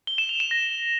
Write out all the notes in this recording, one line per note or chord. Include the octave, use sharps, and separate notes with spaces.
G7
E7
F7
E7
A#6